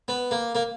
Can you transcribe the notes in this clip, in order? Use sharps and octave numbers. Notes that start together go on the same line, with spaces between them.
B3
A#3
A#3